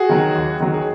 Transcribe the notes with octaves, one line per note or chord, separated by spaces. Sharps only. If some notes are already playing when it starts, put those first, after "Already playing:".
Already playing: F#4 G#4
D#3 F#3
D#2
D#3 F#3
G#4